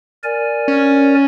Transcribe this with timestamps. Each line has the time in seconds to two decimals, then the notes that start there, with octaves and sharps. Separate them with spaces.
0.24 A#4 D5 G#5
0.68 C#4